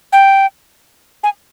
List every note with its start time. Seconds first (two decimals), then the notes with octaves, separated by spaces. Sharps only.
0.12 G5
1.23 G#5